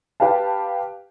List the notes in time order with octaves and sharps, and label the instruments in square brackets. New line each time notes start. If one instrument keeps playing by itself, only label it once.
[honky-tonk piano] G4 B4 F5 A5